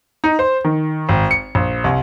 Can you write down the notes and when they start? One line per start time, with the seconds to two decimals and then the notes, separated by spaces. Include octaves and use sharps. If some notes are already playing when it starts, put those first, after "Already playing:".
0.24 D#4
0.39 C5
0.65 D#3
1.09 G#1
1.31 C#7
1.55 A#1
1.84 C2